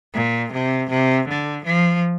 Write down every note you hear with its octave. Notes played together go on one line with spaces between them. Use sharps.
A#2
C3
C3
D3
F3